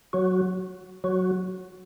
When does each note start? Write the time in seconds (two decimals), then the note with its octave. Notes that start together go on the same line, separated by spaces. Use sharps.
0.13 F#3 F#4
1.04 F#3 F#4